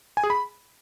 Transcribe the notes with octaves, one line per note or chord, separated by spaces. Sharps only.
G#5
G#4
B5